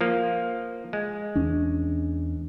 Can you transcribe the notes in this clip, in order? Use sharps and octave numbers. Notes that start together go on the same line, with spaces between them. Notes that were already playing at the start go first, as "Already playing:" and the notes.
F3 A#3
G#3
E2 C#4 D4